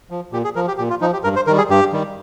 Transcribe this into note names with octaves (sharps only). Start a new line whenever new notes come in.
F3
A#2 G4
G#4
F3 A#4
G4
A#2 G4
F4
F3 D#4
G4
G2 A#4
C5
D#3 G3 A#4
G#4
G2 G4
D#3 G3